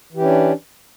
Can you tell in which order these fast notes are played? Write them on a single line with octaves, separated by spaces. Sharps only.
E3 G4 C#4 D4